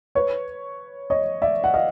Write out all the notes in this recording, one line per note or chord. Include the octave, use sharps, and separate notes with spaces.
B4 C#5
C#5 D#5
D5 E5
F#5
D#5 F5